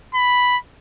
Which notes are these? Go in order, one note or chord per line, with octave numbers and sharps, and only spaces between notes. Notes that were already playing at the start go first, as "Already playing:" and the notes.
B5